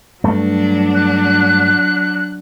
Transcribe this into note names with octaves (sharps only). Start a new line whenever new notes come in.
G2 F#3 A3 D4
F#6